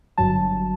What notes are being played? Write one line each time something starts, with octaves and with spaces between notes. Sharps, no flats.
G1 G2 F#3 A5